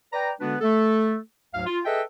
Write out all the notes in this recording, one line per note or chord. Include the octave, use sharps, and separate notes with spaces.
B4 D5 G5 A#5
D3 G#3 B3 D4 F#4 B4
A3 A4
D2 G#2 F#3 F5
F4
G#4 A4 B4 D#5 E5 G5